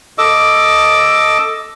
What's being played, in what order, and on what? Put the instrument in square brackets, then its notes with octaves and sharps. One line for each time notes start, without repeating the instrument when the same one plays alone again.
[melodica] A4 D#5 D6 E6